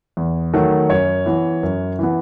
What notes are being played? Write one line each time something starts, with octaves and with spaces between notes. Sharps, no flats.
E2
D#3 F#3 A3
F#2 C#5
E3 B3
F#2
E3 B3